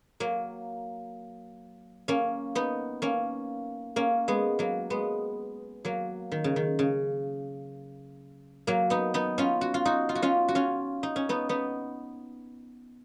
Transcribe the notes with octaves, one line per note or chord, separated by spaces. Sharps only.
F#3 A#3
A#3 C#4
B3 D#4
A#3 C#4
A#3 C#4
G#3 B3
F#3 A#3
G#3 B3
F#3 A#3
D#3
C#3
D#3
C#3
F#3 A#3
B3 D#4
B3 D#4
C#4 F4
F#4
F4
D#4 F#4
F4
F#4
C#4 F4
F#4
C#4 F4
D#4
C#4
B3 D#4
B3 D#4